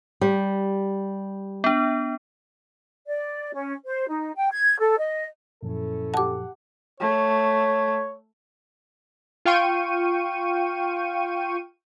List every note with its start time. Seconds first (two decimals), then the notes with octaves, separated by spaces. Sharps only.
0.21 G3 G4
1.64 B3 D4
3.06 D5
3.54 C#4
3.85 C5
4.08 D#4
4.36 G5
4.51 G#6
4.79 A4
4.98 D#5
5.63 F#2 A#2 F3 C#4 E4 A4
6.14 G4 F#5 A5 D6
7.00 A3 C#5
9.45 F4 F5 G5 C#6 D#7